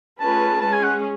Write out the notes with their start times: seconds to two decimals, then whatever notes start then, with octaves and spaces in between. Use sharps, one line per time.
0.20 A3 C#4 F4 G#4 B4 A5
0.61 G#3 C#4 G#4 A5
0.73 G#5
0.83 F#5